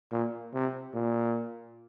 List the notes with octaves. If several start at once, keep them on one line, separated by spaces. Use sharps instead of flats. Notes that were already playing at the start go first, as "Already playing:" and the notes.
A#2
C3
A#2